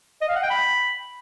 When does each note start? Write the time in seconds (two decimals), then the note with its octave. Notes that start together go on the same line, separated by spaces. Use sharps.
0.22 D#5
0.29 F5
0.36 F#5
0.43 G5
0.50 B5